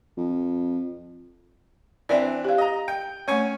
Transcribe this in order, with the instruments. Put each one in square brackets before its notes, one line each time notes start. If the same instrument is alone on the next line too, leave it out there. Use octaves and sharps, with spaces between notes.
[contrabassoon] F2
[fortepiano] E3 C4 D4 [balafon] D5 E5
[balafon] G4 F5
[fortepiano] D#5 A#5
G5
[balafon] A3 C#5 [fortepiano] C#4 G#5 C#6